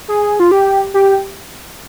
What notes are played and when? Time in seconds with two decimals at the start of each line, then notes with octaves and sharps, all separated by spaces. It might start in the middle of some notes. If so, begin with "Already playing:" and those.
0.08 G#4
0.40 F4
0.51 G4
0.94 G4